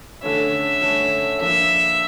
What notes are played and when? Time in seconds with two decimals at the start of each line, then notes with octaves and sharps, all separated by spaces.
0.23 D3 A3 C#4 E5
0.82 D3 A3 C#4
1.40 F3 A#3 D4 E5